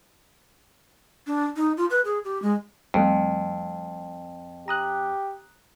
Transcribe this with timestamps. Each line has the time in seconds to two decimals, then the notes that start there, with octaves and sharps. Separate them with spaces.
1.27 D4
1.56 D#4
1.77 F4
1.90 B4
2.05 G#4
2.24 G4
2.42 G#3
2.94 F2 G3 A3 C4
4.68 G4 A#5 D#6 F#6